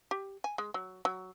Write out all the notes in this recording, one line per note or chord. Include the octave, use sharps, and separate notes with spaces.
G4
G#5
G#3
F#3
F#3